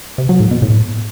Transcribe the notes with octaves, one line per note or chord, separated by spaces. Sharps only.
C3
F#3
A2
B2
A2